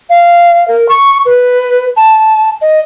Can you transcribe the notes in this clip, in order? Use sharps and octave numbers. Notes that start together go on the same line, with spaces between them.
F5
A#4
C#6
B4
A5
D#5